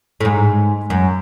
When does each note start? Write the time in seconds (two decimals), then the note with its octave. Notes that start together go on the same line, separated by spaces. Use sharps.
0.21 A2
0.25 G#2
0.90 F#2